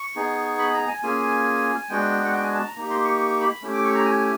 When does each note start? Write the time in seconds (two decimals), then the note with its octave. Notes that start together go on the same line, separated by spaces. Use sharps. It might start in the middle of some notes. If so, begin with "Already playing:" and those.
Already playing: C#6
0.16 B3 D#4 G#4
0.59 B5
0.74 A#5
0.88 G#5
1.02 A#3 C#4 F4 G#4 G#5
1.89 G#3 B3 D4 F#4 G5
2.25 F#5
2.33 G5
2.43 G#5
2.54 A5
2.65 A#5
2.75 A#3 D#4 G4 A#5
2.90 C6
3.04 C#6
3.19 C#6
3.41 B5
3.62 A3 C#4 E4 G4
3.73 D6
3.84 C#6
3.95 A#5
4.05 G#5